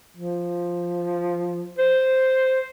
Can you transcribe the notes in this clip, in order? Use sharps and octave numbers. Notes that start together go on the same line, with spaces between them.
F3
C5